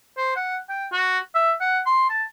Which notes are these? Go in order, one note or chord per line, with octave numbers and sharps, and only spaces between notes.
C5
F#5
G5
F#4
E5
F#5
C6
A5